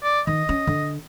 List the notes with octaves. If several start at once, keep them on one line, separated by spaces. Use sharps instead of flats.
D5
D#3 D#5
C#4
D3